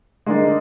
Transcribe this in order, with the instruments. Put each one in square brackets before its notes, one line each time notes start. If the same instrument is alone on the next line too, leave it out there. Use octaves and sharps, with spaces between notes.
[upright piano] D3 G#3 D#4 A#4 D5